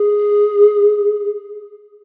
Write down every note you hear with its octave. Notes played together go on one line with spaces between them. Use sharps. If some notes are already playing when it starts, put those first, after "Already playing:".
Already playing: G#4